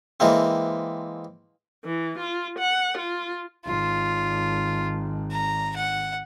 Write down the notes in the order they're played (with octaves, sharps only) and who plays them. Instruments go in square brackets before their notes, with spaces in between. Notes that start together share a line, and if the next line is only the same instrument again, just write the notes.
[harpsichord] E3 G#3 A#3 C4
[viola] E3
F4
F#5
F4
[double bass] G#1 [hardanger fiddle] F4
[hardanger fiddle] A#5
F#5